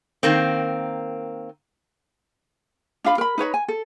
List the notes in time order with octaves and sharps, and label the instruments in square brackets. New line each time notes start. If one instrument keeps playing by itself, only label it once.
[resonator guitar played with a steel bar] D#3 A#3 C4
[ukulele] D4 F4 F5 B5
A#4 B5
D#4 B4 C#5 B5
G#5
A4